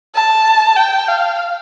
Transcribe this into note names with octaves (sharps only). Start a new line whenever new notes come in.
A5
G5
F5